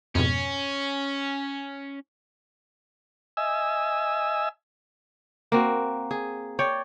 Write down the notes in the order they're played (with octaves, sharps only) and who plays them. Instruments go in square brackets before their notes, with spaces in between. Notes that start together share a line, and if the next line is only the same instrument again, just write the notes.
[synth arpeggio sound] F2 G#2 B2 [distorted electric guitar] C#4
[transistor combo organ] D#5 E5 G#5 E6
[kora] A#3 C4 F#4
G#4
C#5 D5 G5